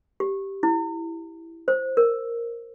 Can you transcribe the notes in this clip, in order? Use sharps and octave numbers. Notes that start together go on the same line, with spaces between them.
G4
E4
C5
A#4